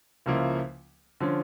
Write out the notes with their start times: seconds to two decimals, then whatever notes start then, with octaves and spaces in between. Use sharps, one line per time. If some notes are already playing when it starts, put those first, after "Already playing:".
0.26 C#2 C#3 F3 A#3 E4
1.20 D3 F3 C#4